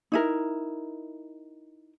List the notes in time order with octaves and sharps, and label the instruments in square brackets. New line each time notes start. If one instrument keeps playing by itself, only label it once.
[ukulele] D#4 E4 A#4